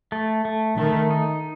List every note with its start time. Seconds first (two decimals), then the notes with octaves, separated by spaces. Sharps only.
0.12 A3
0.45 A3
0.77 D#3 A3
1.10 D#4